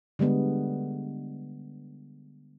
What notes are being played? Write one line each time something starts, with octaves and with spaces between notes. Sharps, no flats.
D3 G3 G#3 B3